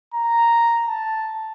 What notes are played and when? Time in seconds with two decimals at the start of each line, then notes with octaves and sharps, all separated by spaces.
0.14 A#5
0.87 A5